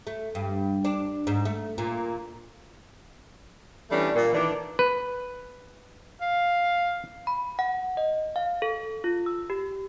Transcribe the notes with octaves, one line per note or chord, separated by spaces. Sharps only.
A3
G2
D4
G#2
A3
A#2
E3 G3 A3 C#4 D4
A#2
D#3 E3 D4
B4
F5
B5
F#5
D#5
F5
A4
F4
E6
G4